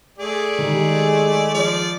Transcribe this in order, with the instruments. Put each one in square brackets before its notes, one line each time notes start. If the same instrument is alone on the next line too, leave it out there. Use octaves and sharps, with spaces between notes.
[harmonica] A3 G#4 D5
[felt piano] D#3 G3 [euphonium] G#3
[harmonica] F3 D5